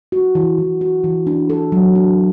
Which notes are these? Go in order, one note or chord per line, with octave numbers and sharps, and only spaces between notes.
F#4
E3
E3
F#4
E3
D4
A4
F#3
D4